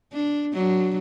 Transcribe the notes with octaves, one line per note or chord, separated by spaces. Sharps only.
D4
F#3 D4